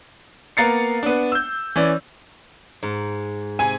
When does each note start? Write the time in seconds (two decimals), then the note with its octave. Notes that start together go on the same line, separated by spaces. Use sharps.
0.57 A#3 B3 A#5 A6 C7 C#7
1.03 B3 D4
1.32 E6 G6
1.76 E3 C#4 D5
2.83 G#2
3.59 C3 G#5